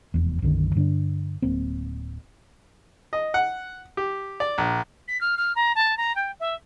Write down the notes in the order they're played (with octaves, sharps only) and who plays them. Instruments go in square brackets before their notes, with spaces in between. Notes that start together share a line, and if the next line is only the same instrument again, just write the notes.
[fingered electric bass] F1 E2
B1 F#2 D3 D#3
G2 D3 C4 D4
D1 A#3 C4
[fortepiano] D#5
F#5
G4
D5
A#1
[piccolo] B6
F6
F6
A#5
A5
A#5
G5
E5